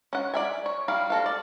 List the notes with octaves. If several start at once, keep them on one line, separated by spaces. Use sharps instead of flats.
C#4 F#5
D5 E5 G#5
C#5
G3 E4 F5
F#4 A4 F5
D5